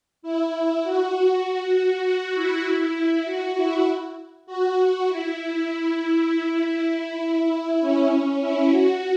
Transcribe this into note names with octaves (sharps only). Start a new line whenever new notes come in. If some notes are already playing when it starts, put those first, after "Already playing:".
E4
E4
F#4
F#4
F#4
F#4
E4
F#4
E4
F#4
E4
E4
E4
C#4
E4
F#4